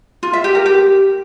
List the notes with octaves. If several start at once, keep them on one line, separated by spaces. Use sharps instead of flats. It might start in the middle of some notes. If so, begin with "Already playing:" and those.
F4
E5
G4
A#4
G4